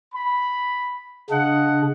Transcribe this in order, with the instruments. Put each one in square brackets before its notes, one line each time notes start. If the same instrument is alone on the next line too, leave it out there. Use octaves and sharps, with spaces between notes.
[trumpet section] B5
[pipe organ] C#3 D4 [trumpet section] D#5 F5 F#5